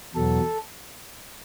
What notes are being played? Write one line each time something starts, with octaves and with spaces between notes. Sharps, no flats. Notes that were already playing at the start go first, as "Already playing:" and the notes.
E2 B2 F#3 A4